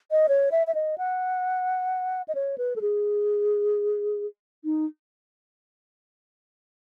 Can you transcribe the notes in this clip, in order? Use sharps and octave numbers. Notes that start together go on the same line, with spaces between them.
D#5
C#5
E5
E5
D#5
F#5
D#5
C#5
B4
A4
G#4
D#4